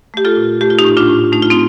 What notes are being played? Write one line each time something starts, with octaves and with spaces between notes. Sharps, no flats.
A3 G4
F4 A4
A#2
A3 G4
F4
D#4 G4
A2
D4 F4
A2
A3 D#4
F4
C4 D#4